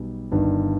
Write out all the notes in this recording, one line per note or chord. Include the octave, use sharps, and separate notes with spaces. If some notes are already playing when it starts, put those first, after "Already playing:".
Already playing: B1 B2 G3
G1 G2 D#3